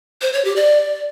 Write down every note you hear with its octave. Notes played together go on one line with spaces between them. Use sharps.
C5
C#5
G4
D5